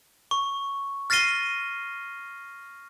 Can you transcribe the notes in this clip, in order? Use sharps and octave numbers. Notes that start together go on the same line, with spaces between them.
C#6
F6 A6 A#6 C7 D#7 G7